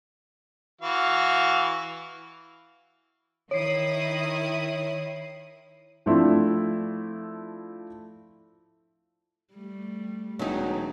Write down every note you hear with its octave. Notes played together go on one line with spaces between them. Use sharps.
E3 F#4 F5
D#3 E4 C#5 D#6 C7
F3 A3 C4 D4 E4
G3 A3
E1 F#3 D#4